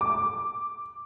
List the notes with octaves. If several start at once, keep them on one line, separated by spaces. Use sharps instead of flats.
D6